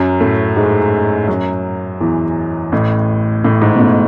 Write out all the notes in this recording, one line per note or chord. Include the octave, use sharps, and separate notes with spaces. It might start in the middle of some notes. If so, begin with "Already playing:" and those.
Already playing: F#2 F#3
A2 A3
G#2 G#3
F#2 F#3
E2 E3
A1 A2
A1 A2
G#2
B2
A1 A2